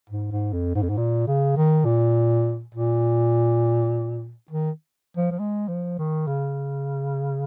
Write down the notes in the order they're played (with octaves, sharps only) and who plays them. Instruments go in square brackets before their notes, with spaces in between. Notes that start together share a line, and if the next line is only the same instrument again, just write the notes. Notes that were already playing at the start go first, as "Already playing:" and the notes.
[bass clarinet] G#2
G#2
F2
G#2
F2
G#2
A#2
C#3
D#3
A#2
A#2
D#3
F3
F3
G#3
F3
D#3
C#3